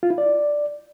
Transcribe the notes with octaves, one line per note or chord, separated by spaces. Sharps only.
F4
E4
D5